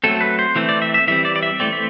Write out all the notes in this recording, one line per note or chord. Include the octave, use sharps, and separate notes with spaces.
F#3 A3 C4 A4
B4
C5
E3 A3 C4
D5
E5
E5
E3 G3 C4 E5
D5
D5
E5
E3 A3 C4 D5
E5